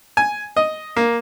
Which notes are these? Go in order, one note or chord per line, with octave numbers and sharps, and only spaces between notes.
G#5
D#5
A#3